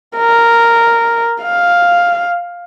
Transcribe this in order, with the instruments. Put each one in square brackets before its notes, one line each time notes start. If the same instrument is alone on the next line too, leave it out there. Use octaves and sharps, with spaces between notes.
[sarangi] A#4
F5